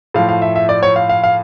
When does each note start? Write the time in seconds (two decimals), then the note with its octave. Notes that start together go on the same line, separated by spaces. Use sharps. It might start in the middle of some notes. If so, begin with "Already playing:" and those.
0.14 A2 F3 F5
0.29 F5
0.42 E5
0.56 E5
0.69 D5
0.83 C#5
0.96 F5
1.09 F5
1.24 F5